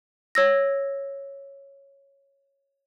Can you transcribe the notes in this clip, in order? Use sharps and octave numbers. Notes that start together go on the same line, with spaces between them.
C#5 E6 A#6